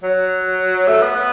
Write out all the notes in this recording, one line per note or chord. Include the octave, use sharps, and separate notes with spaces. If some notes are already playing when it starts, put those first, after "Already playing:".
F#3
A3
B3
B3